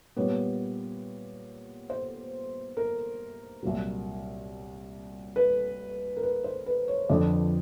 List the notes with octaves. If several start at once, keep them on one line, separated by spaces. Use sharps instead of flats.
A#2 G3 B3 C#5
C5
A#4
C2 A#2 F#3
B4
A#4
B4
C5
B4
C#5
F2 D3 F3 D5